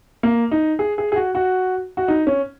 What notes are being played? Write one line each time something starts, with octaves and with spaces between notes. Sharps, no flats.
A#3
D#4
G#4
G#4
G#4
F#4
F#4
F#4
D#4
C#4